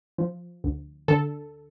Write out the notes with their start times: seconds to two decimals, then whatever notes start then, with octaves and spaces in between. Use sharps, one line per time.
0.18 F3
0.64 D2
1.08 D3 A4